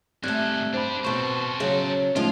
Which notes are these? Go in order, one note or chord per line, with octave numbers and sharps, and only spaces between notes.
G#2 G3 A3 C4 A4 F#6 G#6
D4 G4 C5 B5
B2 C4 A4 C5 C#6
C#3 F#3 G#4
A2 F3 G#3 C#4 D#4 F4 D#5